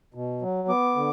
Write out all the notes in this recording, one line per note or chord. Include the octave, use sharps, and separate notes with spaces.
B2
F#3
B3 D6
D3